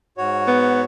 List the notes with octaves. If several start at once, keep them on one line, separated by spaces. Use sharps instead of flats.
G#2 F#4 C#5
B3